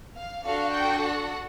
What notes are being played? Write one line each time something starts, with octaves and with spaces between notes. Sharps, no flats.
F5
D4 F#4 A4 F5
G5
F#5